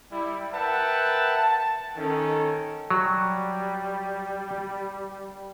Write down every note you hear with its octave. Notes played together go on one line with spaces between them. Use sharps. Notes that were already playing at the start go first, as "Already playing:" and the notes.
G3 E4
A#4 B4 E5 F#5 G5 A5
A5
D#3 C#4 A4
F#3 G3